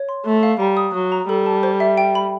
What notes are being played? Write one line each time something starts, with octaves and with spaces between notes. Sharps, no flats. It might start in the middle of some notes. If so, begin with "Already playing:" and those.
Already playing: C#5
C6
A3 C6
F5
G3 A#5
D#6
F#3 D#6
A#5
G3 A4
A5
C5
E5
G5
B5